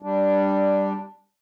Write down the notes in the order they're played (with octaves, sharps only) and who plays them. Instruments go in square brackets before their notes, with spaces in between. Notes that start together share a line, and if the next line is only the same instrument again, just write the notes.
[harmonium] G3 D4